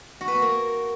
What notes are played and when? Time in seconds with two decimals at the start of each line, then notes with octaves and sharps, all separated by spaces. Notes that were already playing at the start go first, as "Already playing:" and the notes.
0.21 F#4
0.28 B4
0.35 B3
0.42 A#3